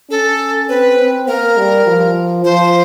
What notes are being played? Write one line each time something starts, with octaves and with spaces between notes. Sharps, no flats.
C#4 A4
C4 B4
C4
A#3 A#4
G3
F3
F3 C5